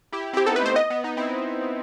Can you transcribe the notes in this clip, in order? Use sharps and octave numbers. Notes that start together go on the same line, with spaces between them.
E4 G4
C4 E4
G4
B3 D#4 A4
B4
A3 C4
C5
B3 D#5
B3
B3 D#4
C4 E4